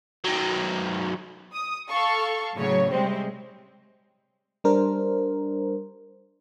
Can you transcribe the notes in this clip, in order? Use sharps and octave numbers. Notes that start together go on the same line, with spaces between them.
D#3 F#3
D#6
A4 F5 C#6
A2 C#3 F#3 C#5
C3 G3 G#3 C4
G3 D4 A#4 C5